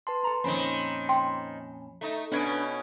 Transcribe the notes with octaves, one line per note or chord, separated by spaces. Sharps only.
B4 A5 C6
A4 A#5
F2 A#2 D#3 C4 C#4 B5
G5 C6
A3 D#4
B2 B3 C#4 D4 B4 G#6 D7